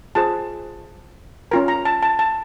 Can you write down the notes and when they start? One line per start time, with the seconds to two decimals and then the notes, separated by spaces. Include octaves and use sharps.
0.15 F4 G#4 C5 A5
1.51 C#4 F4 A#4 A#5
1.68 A#5
1.85 A5
2.03 A5
2.19 A5